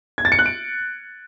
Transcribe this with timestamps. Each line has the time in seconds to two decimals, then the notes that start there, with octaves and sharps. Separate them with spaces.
0.18 G#6
0.25 A6
0.32 C#7
0.39 F#6
0.46 D7